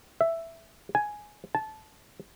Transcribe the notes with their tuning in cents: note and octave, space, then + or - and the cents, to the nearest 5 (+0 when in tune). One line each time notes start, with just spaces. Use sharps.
E5 +5
G#5 +5
A5 -20